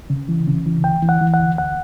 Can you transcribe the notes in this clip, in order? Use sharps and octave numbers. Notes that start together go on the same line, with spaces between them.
C#3
E3
C#3
E3
D2 G5
E3
F#5
E3
F#5
D2
D2 F#5